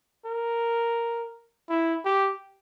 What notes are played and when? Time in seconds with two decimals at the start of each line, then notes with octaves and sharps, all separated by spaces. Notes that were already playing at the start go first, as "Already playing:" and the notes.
0.26 A#4
1.69 E4
2.05 G4